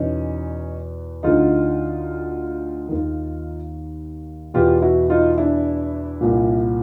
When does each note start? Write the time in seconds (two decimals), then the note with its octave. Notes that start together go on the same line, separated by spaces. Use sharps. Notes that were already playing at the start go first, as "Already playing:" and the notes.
Already playing: E2 B2 C#4 D#4
1.23 D2 D3 D#4 F4
2.89 D#2 D#3
4.54 E2 B2 F4 G4
4.82 E4 F#4
5.10 D#4 F4
5.38 D4 E4
6.21 C2 A#2